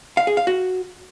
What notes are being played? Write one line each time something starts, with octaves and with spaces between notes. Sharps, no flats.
F5
G#4
F5
F#4